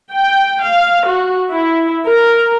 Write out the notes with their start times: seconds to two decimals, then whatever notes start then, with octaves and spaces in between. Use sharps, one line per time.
0.12 G5
0.63 F5
1.07 F#4
1.50 E4
2.07 A#4